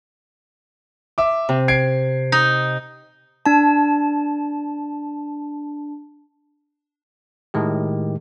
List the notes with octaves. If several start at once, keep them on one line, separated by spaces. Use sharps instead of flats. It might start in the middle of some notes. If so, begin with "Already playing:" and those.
E5 D6
C3
G#6 C7 D7
D#4
D4 A5
A2 D#3 G#3 G4